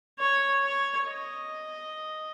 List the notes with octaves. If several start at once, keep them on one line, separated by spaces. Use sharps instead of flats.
C#5
C#5
D#5